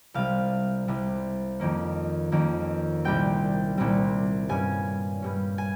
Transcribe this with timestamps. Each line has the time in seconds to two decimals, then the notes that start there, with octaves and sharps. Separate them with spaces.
0.14 C2 C3 G3 F5
0.88 C2 C3 G3
1.59 F2 D#3 A#3 C#4
2.32 F2 D#3 A#3 C#4
3.04 C2 A#2 G3 C4 G5
3.78 C2 A#2 G3 C4
4.49 G2 G3 C#4 G#5
5.22 G2 G3 C#4
5.58 G#5